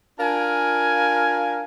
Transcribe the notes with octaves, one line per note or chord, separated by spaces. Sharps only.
D4 F4 A#4 F5 G#5